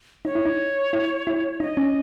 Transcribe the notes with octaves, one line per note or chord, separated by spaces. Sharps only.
D#4 C#5
E4
D#4
E4
E4
D#4 D#5
C#4